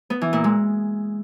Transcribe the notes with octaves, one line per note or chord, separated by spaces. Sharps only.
B3
E3
A#2
G#3